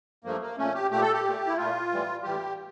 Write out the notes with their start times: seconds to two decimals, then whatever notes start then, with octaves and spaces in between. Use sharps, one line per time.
0.24 G2 F3 A3 A#3
0.41 A#3
0.58 A#2 A3 C#4
0.74 G4
0.91 A#2 A3 G4
1.02 A4
1.13 G4
1.24 A#2 A3
1.47 E4
1.57 A#2 A3 F4
1.90 A2 E3 G3
2.23 A2 E3 G3 G4